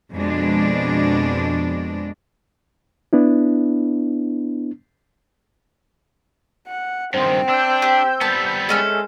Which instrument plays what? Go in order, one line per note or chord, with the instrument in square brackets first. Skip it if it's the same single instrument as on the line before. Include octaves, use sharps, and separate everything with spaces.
[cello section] F2 B2 G#3 D4
[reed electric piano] B3 D4 E4
[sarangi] F#5
[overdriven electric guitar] G2 D#3 [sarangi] C4 [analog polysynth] C5
[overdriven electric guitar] D4 [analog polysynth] E6 G6
[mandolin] G4
[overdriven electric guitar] G3 B3 [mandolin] A5
[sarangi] G#3 [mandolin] A3 C#4 A4